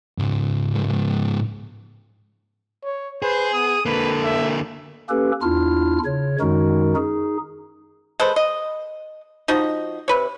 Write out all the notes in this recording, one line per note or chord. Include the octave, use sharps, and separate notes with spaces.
C#2 G#2
C#5
G#4 B4 C5
B3 D#6
D3 A#3 A4 B4
E5
A#3 C#4 G4 A4 B4
E2 D4 E4 F4 F6
C#3 C#5
F#2 D#3 G#3 D#4 F#4 A#4
D#4 G#4
G#3 A4 B4 C5
D#5
F3 D#4 F#4 D#5
C3 B4 C#5